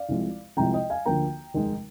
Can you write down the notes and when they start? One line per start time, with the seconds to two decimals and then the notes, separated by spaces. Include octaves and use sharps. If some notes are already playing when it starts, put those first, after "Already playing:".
Already playing: D5 F5
0.09 C2 C3 F3 G#3
0.57 C2 C3 F3 G#3 G5 A#5
0.73 D#5 G5
0.90 F5 G#5
1.06 D2 D3 F3 A#3 G5 A#5
1.54 F1 D#2 D#3 G#3